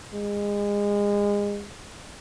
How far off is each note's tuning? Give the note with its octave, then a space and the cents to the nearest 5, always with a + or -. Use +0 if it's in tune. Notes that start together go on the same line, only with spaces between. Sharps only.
G#3 -30